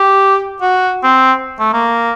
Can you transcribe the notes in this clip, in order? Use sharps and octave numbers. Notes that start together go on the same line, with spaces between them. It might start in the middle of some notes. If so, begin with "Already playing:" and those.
Already playing: G4
F#4
C4
A3
A#3